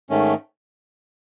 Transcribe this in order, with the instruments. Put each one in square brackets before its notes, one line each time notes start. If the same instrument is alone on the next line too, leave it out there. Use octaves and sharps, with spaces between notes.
[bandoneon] G#2 D#3 A3 C#4